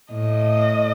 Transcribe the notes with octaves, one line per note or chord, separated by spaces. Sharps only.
A2 D#5